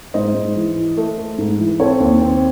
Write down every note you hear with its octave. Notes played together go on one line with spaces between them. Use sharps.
G#2 C5 D#5
G#2
E3
E3
A3
A3
G#2
E3
C4 A4 C#5
D#2
C4